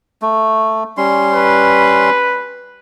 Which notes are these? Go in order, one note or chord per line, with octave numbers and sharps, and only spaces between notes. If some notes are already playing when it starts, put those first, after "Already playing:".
A3
G3 C#4 C6
B4